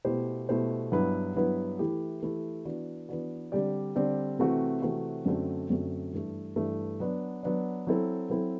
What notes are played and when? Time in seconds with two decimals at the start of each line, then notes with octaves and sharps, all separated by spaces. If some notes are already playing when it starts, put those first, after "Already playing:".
0.05 B2 A3 E4 G4 C5
0.49 B2 A3 E4 G4 C5
0.92 G2 F#3 B3 E4 B4
1.35 G2 F#3 B3 E4 B4
1.79 E3 A3 E4 G4
2.23 E3 A3 E4 G4
2.65 E3 B3 D4 F#4
3.09 E3 B3 D4 F#4
3.52 D3 G3 C4 G4 D5
3.95 D3 G3 C4 G4 D5
4.39 C3 E3 A3 C4 F#4
4.82 C3 E3 A3 C4 F#4
5.25 F#2 D3 A3 C4 F#4
5.70 F#2 D3 A3 C4 F#4
6.13 G2 E3 A3
6.56 G2 E3 A3
7.00 F#3 B3 D4
7.43 F#3 B3 D4
7.87 F#3 C4 E4 A4
8.30 F#3 C4 E4 A4